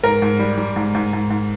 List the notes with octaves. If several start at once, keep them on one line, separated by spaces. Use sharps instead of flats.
G#2 A#4
G#2
G3
G3
G#2
G#2
G#2
G#2